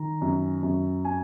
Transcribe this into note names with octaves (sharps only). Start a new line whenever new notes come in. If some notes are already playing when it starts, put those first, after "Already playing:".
Already playing: D#3 A#5
F#2
F#2
G#5